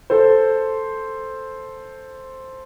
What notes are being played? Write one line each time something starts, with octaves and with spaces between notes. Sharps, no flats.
A4 C5